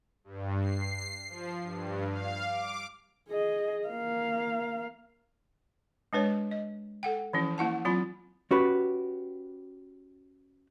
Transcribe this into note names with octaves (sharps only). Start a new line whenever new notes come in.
G2
C7
F3
G2
F5
D6
G#4 D#5
A#3 F5
G#3 D4 B4 C#5
D#5
A4 F#5 G5
E3 F3 C#4 E4
A#3 E4 F#5 A5
F#3 C4 F4 B5
C#4 F#4 G4 B4